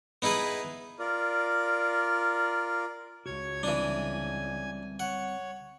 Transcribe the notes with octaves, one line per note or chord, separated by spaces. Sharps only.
B3 D#4 E4 G#4 B4
F4 A#4 D5
C#2 F#4 C#5 G#6
E3 G3 C4 D4 D5 G#5
C#5 F#5